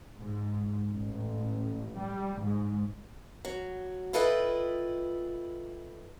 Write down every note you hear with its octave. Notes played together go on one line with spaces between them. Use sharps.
G#2
A1
G3
G#2
F#3
E4 F4 A4 B4 D#5 G5